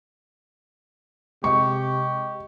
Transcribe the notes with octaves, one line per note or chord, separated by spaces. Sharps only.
C3 G#3 G4 D#5 C#6